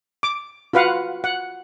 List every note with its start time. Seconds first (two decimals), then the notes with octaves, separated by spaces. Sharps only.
0.23 D6
0.73 F4 F#4 B4 F5 F#5
1.24 F#5